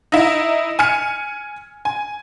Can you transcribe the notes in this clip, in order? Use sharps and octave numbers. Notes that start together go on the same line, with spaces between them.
D#4 E4
G#5 F6 C#7
G#5